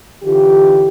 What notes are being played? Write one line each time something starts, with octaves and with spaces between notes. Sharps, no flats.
D3 E3 F4 G4